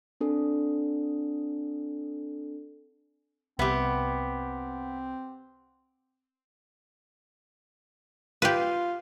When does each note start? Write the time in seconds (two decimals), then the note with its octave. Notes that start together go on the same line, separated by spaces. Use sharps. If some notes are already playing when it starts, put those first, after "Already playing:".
0.21 C4 D4 A4
3.59 C2 B3 C4 G4 E5
8.42 F4 G4 B4